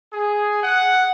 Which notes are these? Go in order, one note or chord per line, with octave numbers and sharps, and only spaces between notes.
G#4
F#5